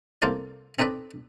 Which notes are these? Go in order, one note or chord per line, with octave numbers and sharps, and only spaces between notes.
C2 A#3 F4 A4 C5 D5
C4 D#4 A4 B4 D5